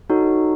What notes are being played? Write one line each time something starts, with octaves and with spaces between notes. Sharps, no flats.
D#4 F#4 A4 C#5